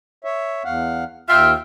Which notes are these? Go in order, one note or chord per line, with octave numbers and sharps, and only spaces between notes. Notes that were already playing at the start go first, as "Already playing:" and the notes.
C#5 E5
E2 F5 F#5
D#2 F4 E5 G5 F6